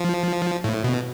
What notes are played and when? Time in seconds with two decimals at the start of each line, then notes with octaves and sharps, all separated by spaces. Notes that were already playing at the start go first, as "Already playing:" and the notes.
Already playing: F3
0.64 A2
0.84 B2